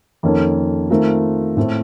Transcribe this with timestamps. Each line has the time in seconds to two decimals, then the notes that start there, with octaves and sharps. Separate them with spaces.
0.23 F2 D#3 A#3 C#4 A4
0.90 D#3 A3 C4 F4 A#4
1.57 A2 A3 C4